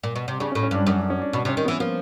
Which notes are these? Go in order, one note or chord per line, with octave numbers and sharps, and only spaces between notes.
A#2
B2
C3
C#3 D4
C#4
A2
C#4
G2 D4
F#2 C#4
D4
C#4
D4
B2 D4
C3
C#4
D#3
B3
E3
F3 A#3